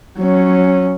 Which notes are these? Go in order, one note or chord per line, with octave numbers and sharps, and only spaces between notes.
F#3 C#4